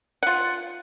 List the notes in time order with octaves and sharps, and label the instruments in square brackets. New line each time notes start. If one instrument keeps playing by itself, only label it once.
[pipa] F4 F#5